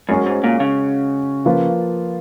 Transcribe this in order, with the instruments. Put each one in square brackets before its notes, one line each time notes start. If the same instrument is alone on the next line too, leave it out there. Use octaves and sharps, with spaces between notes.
[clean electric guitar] F#2 [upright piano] G#3 C#4 F#4
[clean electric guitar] G#2
A#2
C#3
[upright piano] F3 A#3 F4 B4